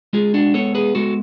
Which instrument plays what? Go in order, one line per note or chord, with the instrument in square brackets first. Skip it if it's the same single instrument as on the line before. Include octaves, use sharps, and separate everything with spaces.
[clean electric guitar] G#3 F4 G#4
D4 F#4
B3 A4 C#5
G#4 B4
G#3 F#4 A4